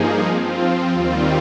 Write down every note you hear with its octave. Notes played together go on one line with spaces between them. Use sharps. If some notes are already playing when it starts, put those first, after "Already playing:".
Already playing: G2 F3 A#3 D#4 G#4
F3 C4 F4
D#2 D#3 G3 C4 F4